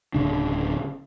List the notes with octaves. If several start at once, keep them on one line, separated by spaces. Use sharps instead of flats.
D1 C#3 D4